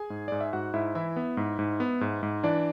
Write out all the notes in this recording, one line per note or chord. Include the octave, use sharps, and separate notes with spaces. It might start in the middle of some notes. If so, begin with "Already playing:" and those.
Already playing: G#4 G#5
G#2
G#2 D5
E5
G#2 F#4 F#5
G#2 E4 E5
E3 E4 E5
B3
G#2
G#2
B3
G#2
G#2
E3 D4 D5